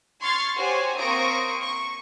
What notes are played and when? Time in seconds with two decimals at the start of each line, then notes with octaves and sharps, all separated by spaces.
0.21 C6 C#6 F6 G#6 A6 C7
0.57 F#4 G4 C5 C#5 G#5
0.97 A#3 C4 C#6 D#6 A#6 D7
1.62 C#6